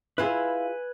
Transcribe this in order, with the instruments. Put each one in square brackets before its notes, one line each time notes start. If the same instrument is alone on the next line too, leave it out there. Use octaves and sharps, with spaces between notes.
[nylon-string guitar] E4 F4 G#4 [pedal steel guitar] B4 G#5 E6